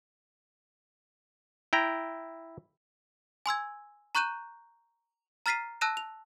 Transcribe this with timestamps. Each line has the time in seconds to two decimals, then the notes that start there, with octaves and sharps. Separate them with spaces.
1.73 E4 G5 A#5
3.46 G#5 C6 E6 G#6
4.15 A#5 C#6 F#6 G6 D#7 E7
5.46 A#5 F6 A6 B6 C7 D#7
5.81 A5 E6 F#6 A#6 D#7 E7
5.97 F7